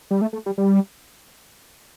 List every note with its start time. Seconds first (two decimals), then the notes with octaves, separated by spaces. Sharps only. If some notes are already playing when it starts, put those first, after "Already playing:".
0.11 G3
0.21 A3
0.33 A3
0.46 G3
0.58 G3